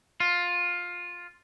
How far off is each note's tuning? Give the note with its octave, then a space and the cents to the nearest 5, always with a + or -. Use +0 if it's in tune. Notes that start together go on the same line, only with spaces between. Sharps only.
F4 +15